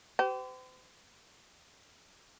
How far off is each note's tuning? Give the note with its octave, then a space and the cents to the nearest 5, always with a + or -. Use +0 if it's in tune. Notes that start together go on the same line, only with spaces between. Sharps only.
G4 -35 C5 -40